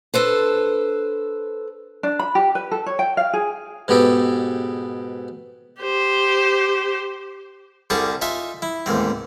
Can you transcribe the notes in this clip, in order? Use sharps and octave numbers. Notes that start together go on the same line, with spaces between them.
D4 A4 B4 C5
D4
B5
G4
B4
A4
C#5
G5
F5
G#4
G#2 B2 B3 G4 A4
G4 C5
C2 D3 G3 G#4 A5
D#4 F4 E5 G#5
E4
A1 D#2 G#2 C4